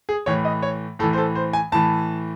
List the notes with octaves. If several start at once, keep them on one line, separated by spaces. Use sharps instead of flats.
G#4
A2 E3 C#5
D#5
C#5
A2 E3 A4
C5
A4
C5
G#5
A2 E3 A5